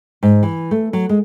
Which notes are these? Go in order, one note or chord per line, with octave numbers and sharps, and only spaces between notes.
G#2
E3
A3
F#3
G#3